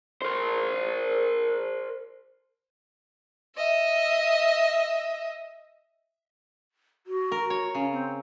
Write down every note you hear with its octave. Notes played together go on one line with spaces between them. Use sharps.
A#4 C5
D#5 E5
F#4
A#4
C#5
C#3 C#4
C4